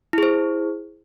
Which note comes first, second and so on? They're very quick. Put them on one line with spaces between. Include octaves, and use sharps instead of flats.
E4 G#4 C5